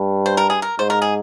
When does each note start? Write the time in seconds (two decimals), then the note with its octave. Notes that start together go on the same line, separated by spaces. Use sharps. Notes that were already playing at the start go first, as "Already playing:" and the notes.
Already playing: G2
0.26 C5
0.37 A#4
0.50 G#4
0.62 A#4
0.79 G#2 C5
0.90 A#4
1.02 G#4